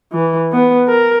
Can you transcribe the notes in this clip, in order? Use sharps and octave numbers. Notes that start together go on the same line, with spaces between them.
E3
B3
A#4